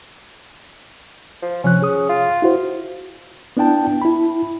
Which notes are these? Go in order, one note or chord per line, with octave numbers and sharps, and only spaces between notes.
F3
C3 F3 C#4 F#6
G#4 D#6
F4
E4 F#4 C5
B3 D4 E4 G5 A5
E4 B5